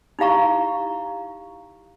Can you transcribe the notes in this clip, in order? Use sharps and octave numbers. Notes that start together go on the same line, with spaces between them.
D#4 E4 G4 F5 A#5 C#6